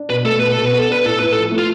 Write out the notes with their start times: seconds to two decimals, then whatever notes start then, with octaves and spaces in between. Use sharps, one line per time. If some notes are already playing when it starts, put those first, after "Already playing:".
Already playing: D4
0.09 B2 B4
0.25 A3 A4
0.39 B2 B4
0.52 A4
0.57 B2
0.65 B4
0.72 B3
0.79 A4
0.88 D4 B4
1.04 A2 A4
1.19 A2 B4
1.32 F3 A4
1.52 A3
1.58 F4